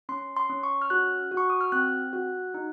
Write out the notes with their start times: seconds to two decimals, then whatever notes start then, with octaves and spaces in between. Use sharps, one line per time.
0.09 C#4 C6
0.36 C6
0.50 C#4
0.63 C#6
0.82 F6
0.90 F#4 F#6
1.31 F#4
1.37 C#6
1.50 D#6
1.61 F6
1.72 C4 F#6
2.13 F#4
2.54 D#4